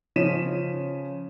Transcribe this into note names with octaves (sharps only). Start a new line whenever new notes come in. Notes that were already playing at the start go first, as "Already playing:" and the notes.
C#3 F3 C#4 B6 D#7 E7